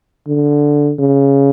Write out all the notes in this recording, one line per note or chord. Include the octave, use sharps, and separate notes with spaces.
D3
C#3